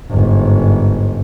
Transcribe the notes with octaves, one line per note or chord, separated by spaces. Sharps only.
G1 G#2